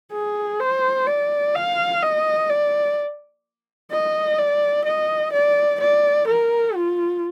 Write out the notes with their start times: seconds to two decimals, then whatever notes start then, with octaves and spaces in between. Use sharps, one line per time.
0.12 G#4
0.60 C5
1.07 D5
1.55 F5
2.02 D#5
2.49 D5
3.91 D#5
4.38 D5
4.85 D#5
5.32 D5
5.80 D5
6.27 A#4
6.75 F4